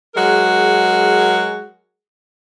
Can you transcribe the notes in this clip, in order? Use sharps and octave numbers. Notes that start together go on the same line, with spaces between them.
F#3 G#3 F#4 G#4 A#4